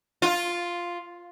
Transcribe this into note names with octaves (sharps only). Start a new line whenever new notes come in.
F4